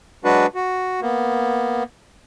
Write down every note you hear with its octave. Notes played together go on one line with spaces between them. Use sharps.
F#3 G#3 D4 F#4 B4
F#4
A#3 B3